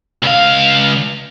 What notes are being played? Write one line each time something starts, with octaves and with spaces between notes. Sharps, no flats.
C#2 F5